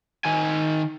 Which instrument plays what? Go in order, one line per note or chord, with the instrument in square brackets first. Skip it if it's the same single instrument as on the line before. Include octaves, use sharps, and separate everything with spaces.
[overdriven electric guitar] D#3 G#5